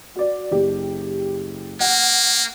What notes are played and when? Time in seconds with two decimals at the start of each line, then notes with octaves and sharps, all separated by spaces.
0.16 F#4 D5
0.51 F#1 G4
1.80 A#3 F#5